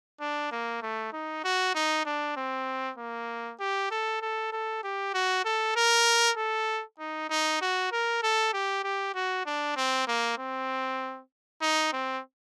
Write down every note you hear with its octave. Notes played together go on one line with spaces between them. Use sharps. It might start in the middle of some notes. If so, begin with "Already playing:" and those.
D4
A#3
A3
D#4
F#4
D#4
D4
C4
A#3
G4
A4
A4
A4
G4
F#4
A4
A#4
A4
D#4
D#4
F#4
A#4
A4
G4
G4
F#4
D4
C4
A#3
C4
D#4
C4